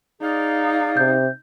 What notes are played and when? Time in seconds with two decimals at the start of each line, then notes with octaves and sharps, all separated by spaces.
0.22 D#4 G#4 D5 F5
0.97 C3 G6